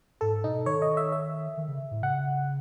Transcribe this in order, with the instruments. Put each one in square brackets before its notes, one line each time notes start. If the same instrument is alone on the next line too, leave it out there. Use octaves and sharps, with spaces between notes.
[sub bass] G#2 [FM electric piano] A4
[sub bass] B2 [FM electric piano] D#4
[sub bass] D#3 [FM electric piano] C#5
[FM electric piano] D#5
E5
E5
[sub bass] D#3
C#3
A2
[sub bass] C#3 [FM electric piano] F#5